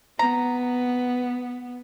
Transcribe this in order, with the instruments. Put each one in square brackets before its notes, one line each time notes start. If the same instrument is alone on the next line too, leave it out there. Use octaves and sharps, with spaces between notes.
[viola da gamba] B3 [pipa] A#5